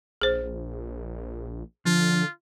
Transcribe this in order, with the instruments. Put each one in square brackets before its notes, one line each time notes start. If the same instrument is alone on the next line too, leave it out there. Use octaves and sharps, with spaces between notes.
[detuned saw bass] A#1 [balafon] G#4 C5
[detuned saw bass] D3 [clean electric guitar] F3 [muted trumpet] F4